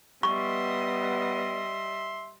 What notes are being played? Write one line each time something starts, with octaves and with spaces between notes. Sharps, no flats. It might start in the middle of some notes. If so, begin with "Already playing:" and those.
G3 B3 D#5 E5 C6 C#6